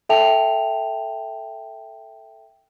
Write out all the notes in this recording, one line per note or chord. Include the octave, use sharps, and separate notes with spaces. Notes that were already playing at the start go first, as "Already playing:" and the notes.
A4 E5 G5 A5 F7